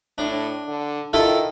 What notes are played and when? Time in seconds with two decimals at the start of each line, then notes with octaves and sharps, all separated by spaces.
0.18 A2 D4
0.68 D3
1.13 D#3 E4 F4 A4